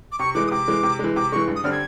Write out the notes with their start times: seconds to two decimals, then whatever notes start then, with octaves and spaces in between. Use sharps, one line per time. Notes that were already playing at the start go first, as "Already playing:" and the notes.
0.12 D6
0.19 C3 C#6
0.34 E3 G#3 D6
0.47 D#6
0.51 C3 D6
0.68 E3 G#3
0.83 C3
0.99 E3 G#3
1.16 C3 D6
1.32 E3 G#3 C#6
1.48 G2
1.56 D#6
1.64 D3 G3 C4 F6
1.72 G#6